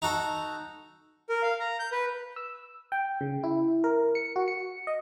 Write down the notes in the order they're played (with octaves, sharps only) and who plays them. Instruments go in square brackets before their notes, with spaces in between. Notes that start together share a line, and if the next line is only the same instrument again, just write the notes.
[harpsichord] D#4 F#4 A4
[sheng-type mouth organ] A#4
F5
A#5
G6
B4
[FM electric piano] E6
G5
C#3
E4
A#4
C#7
F#4
C#7
D#5